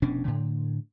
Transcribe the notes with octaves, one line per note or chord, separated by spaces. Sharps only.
F1 B2 C#4 D4
A2 D3